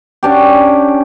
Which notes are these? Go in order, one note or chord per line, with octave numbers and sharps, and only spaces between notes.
C#4 D4 G4